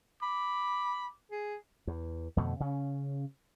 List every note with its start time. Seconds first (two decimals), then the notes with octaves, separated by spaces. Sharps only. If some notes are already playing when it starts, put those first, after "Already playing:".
0.22 B5 D6
1.31 G#4
1.87 E2
2.37 F2 B2 D3 A3
2.60 C#3 C#4